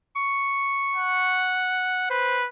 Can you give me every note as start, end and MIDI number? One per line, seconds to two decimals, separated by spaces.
0.16 1.62 85
0.95 2.09 78
2.10 2.48 71
2.10 2.39 72